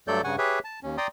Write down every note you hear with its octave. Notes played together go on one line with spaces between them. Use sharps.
G2 F#3 A3 A4 D5 G6
G2 C#3 F#5 G#5 C#6
G4 G#4 B4 C#5 E5
A5
D#2 C#4
D5 G5 A#5 C6 D#6